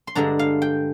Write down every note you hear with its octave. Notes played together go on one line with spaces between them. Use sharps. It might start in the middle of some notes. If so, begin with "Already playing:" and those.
C6
G2 D3 G#3 D4 A#5
F5
G5